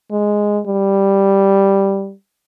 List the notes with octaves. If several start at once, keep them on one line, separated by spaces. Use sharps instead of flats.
G#3
G3